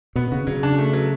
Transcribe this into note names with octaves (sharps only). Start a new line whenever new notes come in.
B2 B3
C#3 F#4
C#3 F#3
D4
A3
F#3